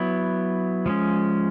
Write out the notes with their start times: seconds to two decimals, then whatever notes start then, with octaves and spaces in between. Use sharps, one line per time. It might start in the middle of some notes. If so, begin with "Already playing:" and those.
Already playing: F#3 B3 E4
0.86 F3 G#3 C#4